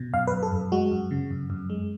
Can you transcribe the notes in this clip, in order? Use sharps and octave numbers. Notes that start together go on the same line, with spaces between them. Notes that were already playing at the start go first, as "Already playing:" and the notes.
Already playing: B2
F#2 F5
B4
F#2
A4
F#2
G#3 F#4
F#2
C#3
F#2
F#2
G#3